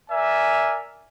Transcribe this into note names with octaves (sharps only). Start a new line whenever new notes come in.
A#4 D5 E5 G#5